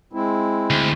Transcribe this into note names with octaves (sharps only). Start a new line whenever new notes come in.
G#3 C4 E4
D2